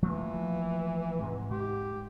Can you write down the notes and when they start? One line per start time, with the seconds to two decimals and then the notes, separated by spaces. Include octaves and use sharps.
0.02 E3 F3 A3 A#3
1.19 G#2 C3 G#3
1.51 G#2 G4